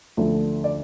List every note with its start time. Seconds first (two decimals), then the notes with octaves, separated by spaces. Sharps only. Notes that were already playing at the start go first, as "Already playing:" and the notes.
0.17 D2 D3 F3 A3
0.64 D5